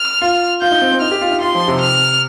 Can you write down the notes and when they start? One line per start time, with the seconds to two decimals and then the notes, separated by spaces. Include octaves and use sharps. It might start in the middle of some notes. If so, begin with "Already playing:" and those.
Already playing: F6
0.22 F4
0.61 F4 G6
0.72 D#4
0.81 C4
0.92 C4
1.01 D#4 F6
1.11 G4
1.21 F4
1.31 D#4
1.41 F4 C6
1.55 F3
1.68 C3
1.81 F6